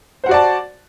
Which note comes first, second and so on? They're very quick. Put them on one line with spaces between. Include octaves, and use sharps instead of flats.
C5 F#5 F#4 D5 A5